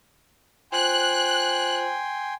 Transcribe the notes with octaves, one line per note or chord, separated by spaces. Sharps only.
F4 C5 G5 G#5 C6 F#6